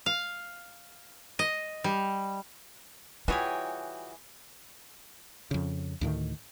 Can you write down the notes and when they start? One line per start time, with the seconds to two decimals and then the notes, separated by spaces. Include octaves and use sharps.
0.06 F5
1.39 D#5
1.84 G3
3.28 E3 G3 F4 F#4 G#4 C#5 G5
5.51 F2 C#3
6.01 D2 A2 D#3